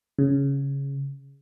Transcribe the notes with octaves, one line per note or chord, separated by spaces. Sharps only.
C#3